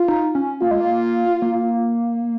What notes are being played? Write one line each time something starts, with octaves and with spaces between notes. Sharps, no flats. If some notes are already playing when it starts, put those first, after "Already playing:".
Already playing: F4
D#4
C#4
A#3 F4
G#3
A#3
A#3